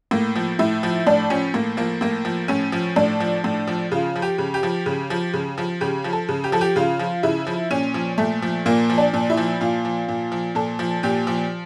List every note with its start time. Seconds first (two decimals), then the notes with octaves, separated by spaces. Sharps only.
0.11 A2 A#3
0.36 F3
0.59 A2 E4
0.83 F3
1.07 A2 D4
1.30 F3 C#4
1.54 A2 A#3
1.77 F3 A#3
2.01 A2 A#3
2.25 F3
2.48 A2 C#4
2.72 F3
2.96 A2 D4
3.20 F3
3.44 A2
3.67 F3
3.92 C#3 F4
4.16 F3
4.22 G4
4.38 C#3
4.54 G4
4.63 F3
4.86 C#3
5.10 F3
5.34 C#3
5.58 F3
5.81 C#3 G4
6.04 F3
6.13 A4
6.29 C#3
6.44 G4
6.52 F3 A4
6.61 G4
6.76 C#3 F4
6.99 F3
7.23 C#3 E4
7.47 F3
7.71 A#2 C#4
7.94 F3
8.18 A#2 A3
8.42 F3
8.66 A#2 A#3
8.90 F3
8.98 D4
9.14 A#2
9.30 E4
9.37 F3
9.61 A#2 F4
9.85 F3
10.08 A#2
10.32 F3
10.55 A#2 A4
10.79 F3
11.03 A#2 G4
11.27 F3